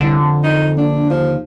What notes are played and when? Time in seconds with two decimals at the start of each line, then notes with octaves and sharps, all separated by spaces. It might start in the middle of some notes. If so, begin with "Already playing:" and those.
0.01 C2 D3
0.19 F2
0.43 D#4
0.77 A#1 D4
1.10 D#2 F3